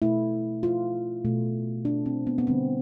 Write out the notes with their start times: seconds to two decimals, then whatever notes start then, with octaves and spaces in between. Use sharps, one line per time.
0.02 B2 A3 E4
0.63 F4
1.25 B2 A3
1.85 D4
2.06 C4
2.27 B3
2.38 B3
2.46 D3 G3 C4